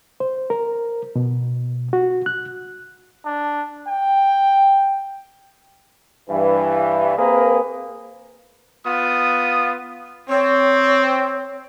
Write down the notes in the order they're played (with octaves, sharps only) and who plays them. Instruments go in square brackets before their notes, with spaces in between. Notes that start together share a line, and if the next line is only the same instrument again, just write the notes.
[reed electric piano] C5
A#4
B2
F#4
F#6
[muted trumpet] D4
G5
[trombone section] G2 E3
A#3 C4 G#4 A#4 B4
[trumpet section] B3 F4 D#6
[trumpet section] C4 [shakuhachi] C#5